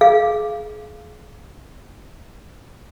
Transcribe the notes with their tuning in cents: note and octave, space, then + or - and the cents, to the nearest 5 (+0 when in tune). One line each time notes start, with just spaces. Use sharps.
G#4 +30 F5 -10